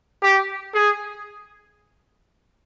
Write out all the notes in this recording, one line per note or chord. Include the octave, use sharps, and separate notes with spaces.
G4
G#4